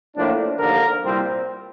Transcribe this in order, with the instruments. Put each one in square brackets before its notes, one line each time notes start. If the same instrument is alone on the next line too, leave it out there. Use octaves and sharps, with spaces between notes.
[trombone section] A2 F3 A#3 D4
D#2 D3 F3 A#3 A#4
C2 A#2 G3 C4